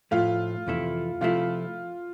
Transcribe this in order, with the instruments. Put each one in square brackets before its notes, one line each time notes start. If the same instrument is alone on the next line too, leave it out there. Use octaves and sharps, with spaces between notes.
[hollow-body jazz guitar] A2 F3 A3 [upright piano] F4
[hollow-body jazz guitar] F2 C3 E3 A3 E4
[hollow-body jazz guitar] C3 F3 A3 E4 [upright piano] F4